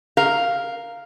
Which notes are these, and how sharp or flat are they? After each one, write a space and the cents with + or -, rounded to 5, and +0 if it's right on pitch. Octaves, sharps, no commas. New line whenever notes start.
A#4 +0 F5 +0